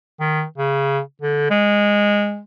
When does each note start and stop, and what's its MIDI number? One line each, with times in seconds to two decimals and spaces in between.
0.20 0.44 51
0.58 0.99 49
1.21 1.45 50
1.50 2.41 56